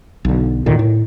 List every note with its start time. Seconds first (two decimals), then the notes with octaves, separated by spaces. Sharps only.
0.25 B1 D3
0.66 D2 A#2 D3 D#3
0.79 A2